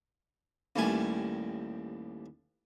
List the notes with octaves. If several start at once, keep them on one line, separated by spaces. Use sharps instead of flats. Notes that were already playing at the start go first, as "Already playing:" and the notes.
A1 D#2 A2 G3 G#5